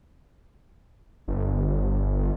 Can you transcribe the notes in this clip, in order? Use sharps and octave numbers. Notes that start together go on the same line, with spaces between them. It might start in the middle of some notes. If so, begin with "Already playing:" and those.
G1